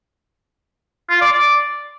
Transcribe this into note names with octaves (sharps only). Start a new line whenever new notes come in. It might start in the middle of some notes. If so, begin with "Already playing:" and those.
F4
D5
D5